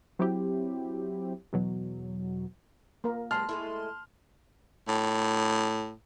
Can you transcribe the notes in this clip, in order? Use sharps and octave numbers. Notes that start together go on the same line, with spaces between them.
F#3 C4 E4 G4
E2 B2 F#3
A#3 A#4
G2 F#3 G#3 A5 C6 F6
G#3 A3 E4
A2